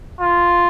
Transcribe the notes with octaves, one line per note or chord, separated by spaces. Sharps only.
F4